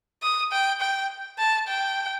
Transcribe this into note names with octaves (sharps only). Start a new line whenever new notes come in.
D#6
G5
G5
A5
G5